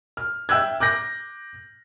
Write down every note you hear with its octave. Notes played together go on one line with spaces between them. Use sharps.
F6
E5 G5 E6 F#6 G#6
D6 F#6 G6 A#6